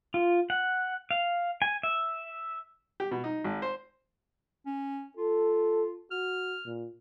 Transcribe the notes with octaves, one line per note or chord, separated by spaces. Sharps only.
F4
F#5
F5
G#5
E5
G4
B2
D#4
G#1
C5
C#4
F4 A4
F#4 F6
A#2